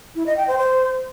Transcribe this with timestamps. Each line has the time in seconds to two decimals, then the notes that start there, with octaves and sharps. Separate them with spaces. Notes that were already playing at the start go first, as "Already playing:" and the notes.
0.15 E4
0.26 D#5
0.37 G5
0.48 C5
0.58 C5